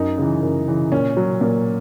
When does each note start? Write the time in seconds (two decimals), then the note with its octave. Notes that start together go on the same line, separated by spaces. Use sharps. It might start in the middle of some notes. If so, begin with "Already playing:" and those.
Already playing: F#2 D#4
0.18 C#3 E3
0.43 F#2
0.68 C#3 E3
0.92 A#2 C#4
1.17 F#3
1.41 A#2